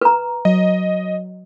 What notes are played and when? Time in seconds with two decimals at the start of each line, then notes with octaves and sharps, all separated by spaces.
0.01 B4 A#5
0.45 F#3 D#5